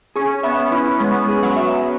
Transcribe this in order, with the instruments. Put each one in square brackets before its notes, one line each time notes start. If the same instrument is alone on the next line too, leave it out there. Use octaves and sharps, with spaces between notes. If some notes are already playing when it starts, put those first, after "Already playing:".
[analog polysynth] C#4 [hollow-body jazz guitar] G#4
[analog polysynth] B3 [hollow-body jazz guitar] E5
[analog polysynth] C#4 [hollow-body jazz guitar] E4
[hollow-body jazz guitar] G#3 [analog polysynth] B3
[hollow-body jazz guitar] G#4
[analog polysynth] F#3
[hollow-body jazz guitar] E5